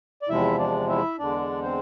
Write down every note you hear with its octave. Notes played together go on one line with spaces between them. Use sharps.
D5
E2 C3 F3 G#3 E4 E5
D4 D5
E4 E5
E2 D3 G#3 D4 D5
C4 C5